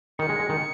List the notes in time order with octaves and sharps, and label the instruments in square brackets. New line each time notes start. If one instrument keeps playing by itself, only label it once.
[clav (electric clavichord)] D#3 [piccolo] C#7
[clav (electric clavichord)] G#3
G#3
D#3